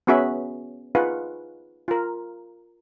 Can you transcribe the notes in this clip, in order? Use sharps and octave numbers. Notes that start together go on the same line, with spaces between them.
B3 C#4 F#4 G#4 E5 B5
D#4 F4 G#4 B4 F5 F#5
F4 A#4